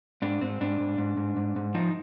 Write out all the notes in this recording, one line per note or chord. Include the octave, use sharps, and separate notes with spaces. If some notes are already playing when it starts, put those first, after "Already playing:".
G#2 D4
G#2 C4
G#2 D4
G#2
G#2
G#2
G#2
G#2
F3 D#4